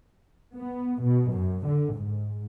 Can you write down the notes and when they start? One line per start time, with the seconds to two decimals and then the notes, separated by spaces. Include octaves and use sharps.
0.56 B3
1.02 B2
1.32 F#2
1.66 D3
1.96 G#2